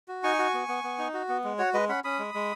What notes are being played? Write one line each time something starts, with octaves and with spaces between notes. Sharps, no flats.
F#4
D#4 G#5 C#6
F#4
B3
B3
B3
D#4
F#4
B3
G#3
F#4 C#5 F#5
G#3 B4 D#5
C#4 F#5 B5
C#4 B5 D#6
G#3
G#3